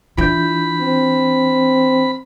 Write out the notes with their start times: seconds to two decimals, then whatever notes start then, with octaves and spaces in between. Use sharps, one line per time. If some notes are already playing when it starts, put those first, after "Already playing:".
0.17 E3 D4 E4 F4 B5 G6
0.81 C4